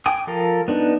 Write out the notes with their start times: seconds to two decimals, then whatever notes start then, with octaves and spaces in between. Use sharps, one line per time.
0.06 G5 G#5 D6 D#6
0.27 F3 A4 A#4
0.68 B3 D4 D#4